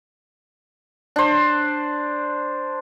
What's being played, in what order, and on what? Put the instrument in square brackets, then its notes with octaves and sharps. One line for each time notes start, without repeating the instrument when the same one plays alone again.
[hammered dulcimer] D4 C5